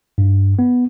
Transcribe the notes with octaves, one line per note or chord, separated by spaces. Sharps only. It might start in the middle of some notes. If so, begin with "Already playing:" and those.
G2
B3